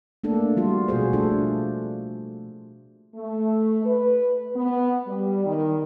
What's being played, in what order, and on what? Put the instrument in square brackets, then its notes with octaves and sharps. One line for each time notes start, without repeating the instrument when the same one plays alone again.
[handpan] A3 A#3 D4 A4
F3 G3 F4 F#4
B2 F#4 G#4 C5
A3 D4 F4 A4
[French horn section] A3
B4
B3
G3
D#3